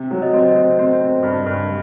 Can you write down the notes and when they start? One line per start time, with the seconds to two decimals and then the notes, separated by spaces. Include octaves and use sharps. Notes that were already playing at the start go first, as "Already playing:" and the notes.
Already playing: C3
0.11 F#3
0.22 D#5
0.33 C4
0.39 D#5
0.56 C4
0.79 C4
1.00 C4
1.23 G2
1.46 G2